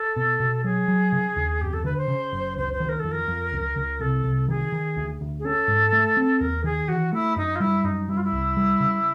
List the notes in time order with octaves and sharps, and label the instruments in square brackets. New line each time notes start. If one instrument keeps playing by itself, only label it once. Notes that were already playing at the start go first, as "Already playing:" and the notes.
Already playing: [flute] A4
[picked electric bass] B2
B2
[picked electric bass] F#3 [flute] G#4
[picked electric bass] F#3
C#3
D#2
[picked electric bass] F#2 [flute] G4
[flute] A4
[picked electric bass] D3 [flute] B4
[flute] C5
[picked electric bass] C#3
F#1
[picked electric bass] C#2 [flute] C5
[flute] C5
[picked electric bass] D#3
[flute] A#4
A4
[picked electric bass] F2
[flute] A#4
[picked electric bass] F2
C#2
C#2
[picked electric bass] C2 [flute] A4
[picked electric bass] C2
[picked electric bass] D#3 [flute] G#4
[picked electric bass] D#3
D2
D2
[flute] G#4
[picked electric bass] C#4 [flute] A4
[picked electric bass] G#2
A3
C4
[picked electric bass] D#2 [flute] A#4
[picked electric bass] D#3 [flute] G#4
[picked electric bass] E3 [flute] F#4
[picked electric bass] A3 [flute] E4
[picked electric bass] F#2 [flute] D#4
[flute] F4
[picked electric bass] G3 [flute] E4
[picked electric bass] F#2 [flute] D#4
[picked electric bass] G3 [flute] E4
[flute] F4
E4
[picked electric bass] C2
G3
C#3